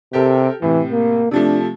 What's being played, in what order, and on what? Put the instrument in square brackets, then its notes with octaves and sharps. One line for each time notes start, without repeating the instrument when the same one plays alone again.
[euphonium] C3 [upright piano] G4 A4 A#4
[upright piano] A2 C3 [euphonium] E3
[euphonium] A#3
[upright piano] C3 F3 A3 [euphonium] D4